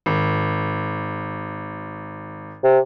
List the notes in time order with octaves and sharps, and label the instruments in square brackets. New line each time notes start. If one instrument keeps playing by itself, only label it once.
[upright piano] G#1
[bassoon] C3